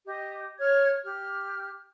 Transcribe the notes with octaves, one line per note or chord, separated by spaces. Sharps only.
G4 D#5
C#5 F6 G#6
G4 F6